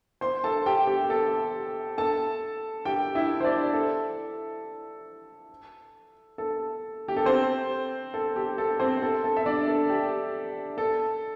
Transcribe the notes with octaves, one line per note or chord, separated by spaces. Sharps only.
C5 C6
A4 A5
G4 G5
G4
A4
A4 A5
G4 G5
E4 E5
C5
D4 D5
A4
A4
G4
A4
C4 C5
A4
G4
A4
C4 C5
A4
A4
E5
D4 D5
A4
G4
A4